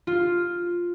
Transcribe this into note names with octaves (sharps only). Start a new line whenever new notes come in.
F4